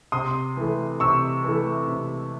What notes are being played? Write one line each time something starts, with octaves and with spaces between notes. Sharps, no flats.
C3 C6 D#6
E3 A3
C3 C#6 E6
E3 A3
C3